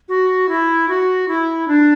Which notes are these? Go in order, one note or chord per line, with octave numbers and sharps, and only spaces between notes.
F#4
E4
F#4
E4
D4